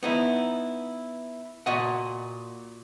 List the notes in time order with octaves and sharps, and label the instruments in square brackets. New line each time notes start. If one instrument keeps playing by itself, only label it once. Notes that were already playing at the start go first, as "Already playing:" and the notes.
[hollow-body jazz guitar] B3 D#4 E4
A#2 F#4 D#5 F#5